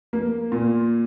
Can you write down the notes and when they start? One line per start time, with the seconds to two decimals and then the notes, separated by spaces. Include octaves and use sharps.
0.13 A#3
0.52 A#2